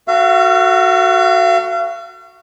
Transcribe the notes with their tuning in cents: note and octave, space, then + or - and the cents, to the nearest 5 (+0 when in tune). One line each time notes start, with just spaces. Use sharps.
F#4 +0 A4 +30 F5 -40